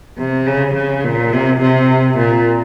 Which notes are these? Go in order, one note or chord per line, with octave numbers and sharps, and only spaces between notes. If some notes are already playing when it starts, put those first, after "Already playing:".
C3
C#3
C#3
A#2
C3
C3
A#2